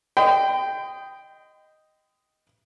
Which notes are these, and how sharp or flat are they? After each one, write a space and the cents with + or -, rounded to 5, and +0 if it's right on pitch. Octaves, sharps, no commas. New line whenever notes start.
D#5 +0 G5 +0 C6 -45